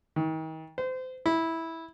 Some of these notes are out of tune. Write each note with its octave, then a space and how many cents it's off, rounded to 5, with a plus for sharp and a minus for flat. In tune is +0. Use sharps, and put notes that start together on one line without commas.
D#3 +40
C5 -30
E4 -10